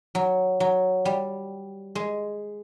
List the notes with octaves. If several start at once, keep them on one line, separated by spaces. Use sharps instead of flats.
F#3
F#3
G3
G#3